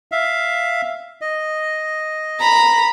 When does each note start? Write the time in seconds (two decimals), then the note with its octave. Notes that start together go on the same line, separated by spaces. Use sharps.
0.12 E5 F5
1.21 D#5
2.40 A#5 B5